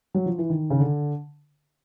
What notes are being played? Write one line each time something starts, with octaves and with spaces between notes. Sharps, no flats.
F#3
F3
E3
D#3
C#3
D3